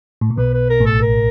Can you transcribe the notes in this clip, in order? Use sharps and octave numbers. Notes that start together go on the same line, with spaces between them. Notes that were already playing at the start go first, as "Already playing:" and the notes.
A2
A#2
B1 B2 B4
B4
A#4
A1 A2
A4
A#4